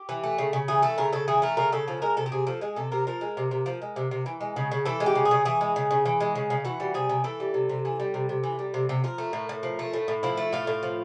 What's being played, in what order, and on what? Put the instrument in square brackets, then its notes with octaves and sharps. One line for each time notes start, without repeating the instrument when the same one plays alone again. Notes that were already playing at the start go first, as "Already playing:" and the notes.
Already playing: [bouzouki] G4
E3
A3
C#3
C#3
E3 G#4
A3 A4
C#3 A#4
C#3 A4
E3 G#4
A3 A#4
C#3 A#4
C#3 A4
F3 A4
G#3 A#4
C3 A4
G4
C3 G#4
F3 A4
G#3 G#4
C3 A4
C3 A#4
F3 A#4
G#3
C3
C3
F3
G#3
C3
C3
E3
G#3
C#3
C#3
E3 A4
G#3
G4
C#3
G#4
C#3
E3 G#4
G#3
C#3
C#3
E3
G#3
C#3
C#3
E3 F#4
G3
C3 G#4
C3
E3 A4
G3
C3
C3
E3
G3
C3
C3
E3
G3
C3
C3
F3 A#4
A3
A2
A2
F3
A3
A2
A2
F3 E4
A3
A2 F4
A2
F3